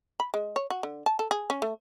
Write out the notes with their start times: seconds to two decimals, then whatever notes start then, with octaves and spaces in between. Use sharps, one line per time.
0.20 B5
0.34 G#3
0.56 C#5
0.70 F#4
0.83 D3
1.06 A5
1.19 A4
1.31 G#4
1.50 C#4
1.62 A3